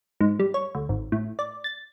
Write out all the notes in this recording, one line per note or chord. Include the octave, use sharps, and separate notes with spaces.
G#2
G3
C#5
D2
G#1
A2
D5
A6